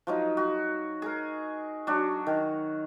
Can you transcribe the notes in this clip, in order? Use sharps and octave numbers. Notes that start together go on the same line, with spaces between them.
F3 F#3 D#4
F#4
G#4 A#4
F#3 D4 F#4
D#3